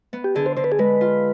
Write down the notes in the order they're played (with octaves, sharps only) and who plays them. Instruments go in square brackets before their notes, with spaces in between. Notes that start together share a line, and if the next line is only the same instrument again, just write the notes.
[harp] B3
[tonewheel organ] G4
[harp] D3 [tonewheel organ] G#4
[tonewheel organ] C5
[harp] D3 [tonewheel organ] C5
[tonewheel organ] B4
G#4
[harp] G#3 [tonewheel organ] B4
[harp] F4